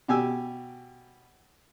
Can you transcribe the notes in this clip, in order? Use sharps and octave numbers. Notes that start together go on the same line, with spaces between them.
B2 G4 G#5 E6